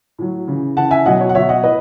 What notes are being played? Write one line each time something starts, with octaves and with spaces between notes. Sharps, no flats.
A2 F#3
C#3 E3
C#3 E3 F#5 A5
E5 G#5
B2 F#3 D#5 F#5
C#5
F#5
B2 F#3 C#5 E5
D#5 F#5
A2 B4 D#5